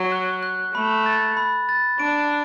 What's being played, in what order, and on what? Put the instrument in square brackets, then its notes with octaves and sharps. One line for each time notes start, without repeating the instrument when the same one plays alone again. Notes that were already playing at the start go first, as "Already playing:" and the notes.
Already playing: [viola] F#3
[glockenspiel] F#6
F#6
[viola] A3 [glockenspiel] B5
[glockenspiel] A6
B5
A6
[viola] D4 [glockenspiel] D7